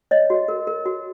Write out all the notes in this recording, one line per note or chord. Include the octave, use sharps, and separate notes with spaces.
C#5 D#5
F#4
A#4
A#4
F#4